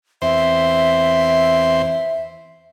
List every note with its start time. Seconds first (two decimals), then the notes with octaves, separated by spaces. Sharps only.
0.22 E2 C4 C5 E5